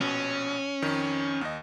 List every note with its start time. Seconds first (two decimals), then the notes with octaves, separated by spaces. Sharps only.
0.01 A#1 B2 C#4
0.82 F2 D#3
1.41 D#2 D#5